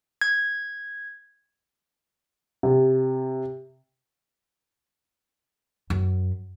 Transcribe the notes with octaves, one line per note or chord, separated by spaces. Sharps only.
G#6
C3
F#2